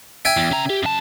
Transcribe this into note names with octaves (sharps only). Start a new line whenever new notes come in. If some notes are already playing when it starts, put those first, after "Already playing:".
E5 G5 G#5
E2
C#3 A#5
G4
F#2 A5